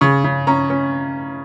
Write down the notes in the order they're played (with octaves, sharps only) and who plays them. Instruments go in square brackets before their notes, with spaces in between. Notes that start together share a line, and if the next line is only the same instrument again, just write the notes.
[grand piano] C#3 C#6
C#3
C#4 A#5
C#4